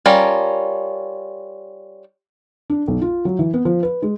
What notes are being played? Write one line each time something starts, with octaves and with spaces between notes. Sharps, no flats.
G3 C#4 F4 A#4
D4
B1
F4
F#3
E3
B3
F3
B4
G#3